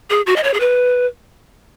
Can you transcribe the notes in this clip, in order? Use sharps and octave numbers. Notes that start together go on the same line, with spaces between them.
G#4
F#4
D#5
C#5
G#4
B4